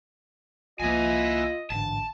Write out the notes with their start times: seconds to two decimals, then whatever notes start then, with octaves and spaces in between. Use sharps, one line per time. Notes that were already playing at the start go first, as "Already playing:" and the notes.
0.80 C2 F3 A#3 E4 F4 D#5 G#5
1.70 A1 G#2 D3 A5